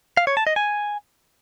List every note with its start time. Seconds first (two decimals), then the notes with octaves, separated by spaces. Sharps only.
0.17 F5
0.27 C#5
0.37 A5
0.47 D#5
0.56 G#5